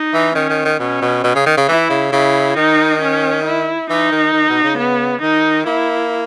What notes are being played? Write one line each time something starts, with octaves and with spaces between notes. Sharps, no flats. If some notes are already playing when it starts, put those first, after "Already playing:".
Already playing: D#4
E3
D#3 C#4
D#3
D#3
B2 C#4
B2
B2
C#3
D#3
C#3
E3 E4
C#3
C#3 E4
D#3 D#4
C#4
E4
E3 D#4
D#3
D#3
B2
C#3
B3
D#3 D#4
A#3 E4